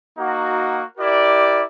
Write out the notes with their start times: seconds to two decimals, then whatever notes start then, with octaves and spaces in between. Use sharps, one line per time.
0.17 A#3 D#4 F#4
0.98 E4 G4 A#4 D5